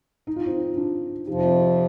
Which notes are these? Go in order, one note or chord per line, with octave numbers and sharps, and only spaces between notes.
D#4
F4
C4 D#4
D4 F4
F2 C3 F3 D#4 G4
C4 D#4
D#4 G4